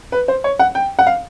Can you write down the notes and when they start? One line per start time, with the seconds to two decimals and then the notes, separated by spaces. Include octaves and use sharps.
0.12 B4
0.28 C5
0.44 C#5
0.59 F#5
0.75 G5
0.99 F#5
1.07 F5